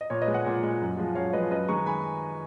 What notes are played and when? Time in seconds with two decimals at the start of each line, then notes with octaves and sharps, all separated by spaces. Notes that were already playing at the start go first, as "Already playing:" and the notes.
0.01 D#5
0.10 A#2 C#5
0.22 B4 D#5
0.28 G#3
0.33 D#5 F#5
0.46 A#2
0.63 G#3
0.81 F#2
0.98 F3 G#3
1.15 F#2 C#5 F5
1.33 F3 G#3 B4 D#5
1.51 F#2 B4 D#5
1.68 D#3 G#3 A#5 C#6
1.86 G#5 B5